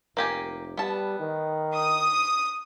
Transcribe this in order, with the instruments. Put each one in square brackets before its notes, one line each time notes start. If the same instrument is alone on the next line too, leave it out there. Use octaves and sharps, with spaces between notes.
[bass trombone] F1 [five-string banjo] A#3 G4 G#5
[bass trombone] G3 [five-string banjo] B3 A5
[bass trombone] D#3
[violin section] D#6